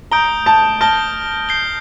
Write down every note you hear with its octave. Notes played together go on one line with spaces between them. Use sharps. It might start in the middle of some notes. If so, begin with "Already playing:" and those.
A#5 D#6 G6 D7 G7
A5
A5 F6 A#6 D7 G7
G6 C7 G7